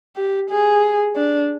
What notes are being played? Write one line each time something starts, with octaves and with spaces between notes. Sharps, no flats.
G4
G#4
D4